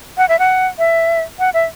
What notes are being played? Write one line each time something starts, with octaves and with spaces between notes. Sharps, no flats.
F#5
E5
F#5
E5
F#5
E5